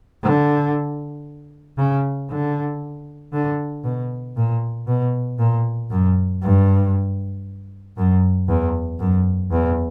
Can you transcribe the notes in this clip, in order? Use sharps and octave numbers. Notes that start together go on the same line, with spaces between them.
D3
C#3
D3
D3
B2
A#2
B2
A#2
F#2
G2
F#2
E2
F#2
E2